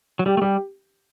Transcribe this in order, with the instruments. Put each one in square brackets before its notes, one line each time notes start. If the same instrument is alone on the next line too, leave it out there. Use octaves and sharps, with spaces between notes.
[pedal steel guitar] F#3
[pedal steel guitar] G3 [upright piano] G4
[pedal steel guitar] A3
[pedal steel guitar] G3 [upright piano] G4